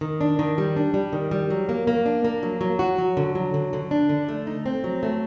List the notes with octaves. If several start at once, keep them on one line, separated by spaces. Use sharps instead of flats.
D#3
D4
D#3
G3
D4
G3
D#3
G3
F#3
A#3
A#3
D4
A#3
F#3
F#3
F#4
F#3
D3
F#3
D3
D3
D4
D3
A3
D#4
C4
F#3
A3